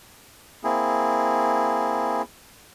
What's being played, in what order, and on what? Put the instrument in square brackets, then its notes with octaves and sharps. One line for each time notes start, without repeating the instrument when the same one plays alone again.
[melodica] A#3 C4 E4 G#4